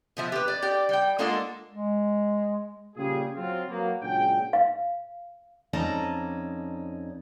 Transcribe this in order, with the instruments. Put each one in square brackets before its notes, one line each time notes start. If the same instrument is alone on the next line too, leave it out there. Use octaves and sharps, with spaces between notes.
[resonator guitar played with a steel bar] B2 F3 E5
G4 B4
D5
G4 D5
G3 G5
G#3 A#3 D4 F4 A4 F#5
[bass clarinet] G#3
[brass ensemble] A#2 C#3 G3 F4 G4 G#4
F#3 C4 F4
F#3 A#3 B3
C#2 A#2 F#3 D4 G#4 G5
[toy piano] F5
[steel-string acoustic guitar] F2 C#4 D#4 D5 A5 A#5